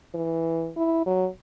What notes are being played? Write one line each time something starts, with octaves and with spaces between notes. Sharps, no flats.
E3
E4
F#3